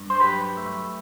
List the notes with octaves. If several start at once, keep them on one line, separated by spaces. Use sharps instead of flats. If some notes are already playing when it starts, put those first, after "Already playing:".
Already playing: G2
C5
F#3 G4 B4
A3